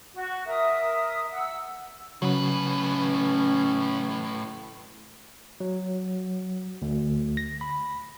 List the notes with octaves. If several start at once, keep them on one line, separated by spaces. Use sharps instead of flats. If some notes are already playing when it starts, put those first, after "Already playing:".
F#4
A#4 E5 D#6
F#5 E6
A2 C#3 F#3 C#4 B4
F#3
D2
A#6
B5